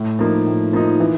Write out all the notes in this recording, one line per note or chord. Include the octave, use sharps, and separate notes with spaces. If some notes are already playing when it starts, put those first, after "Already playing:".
Already playing: A2
F3 A#3 D#4
A2
F3 A#3 D#4
E3